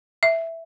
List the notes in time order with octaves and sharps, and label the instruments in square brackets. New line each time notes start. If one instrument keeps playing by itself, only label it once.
[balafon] E5